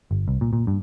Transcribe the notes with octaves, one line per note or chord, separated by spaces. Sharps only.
G1
C2
A#2
A#2
G2